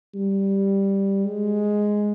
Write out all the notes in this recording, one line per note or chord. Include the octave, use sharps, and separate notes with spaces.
G3
G#3